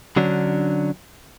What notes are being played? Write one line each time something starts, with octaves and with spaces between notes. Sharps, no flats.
D3 F#3 C#4 D4